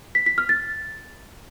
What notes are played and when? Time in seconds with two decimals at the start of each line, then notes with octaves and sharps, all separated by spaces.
0.15 B6
0.26 B6
0.38 F6
0.49 A6